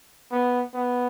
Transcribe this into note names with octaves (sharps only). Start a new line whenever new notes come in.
B3
B3